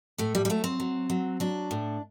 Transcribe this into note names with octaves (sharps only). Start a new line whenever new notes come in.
A2 A3
G3
G3
F#3 A3
C4
F#3
F#3
F#3 D4
A2